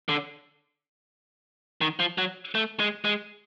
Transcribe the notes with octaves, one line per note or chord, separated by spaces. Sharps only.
D3
D#3
F3
F#3
A3
G#3
G#3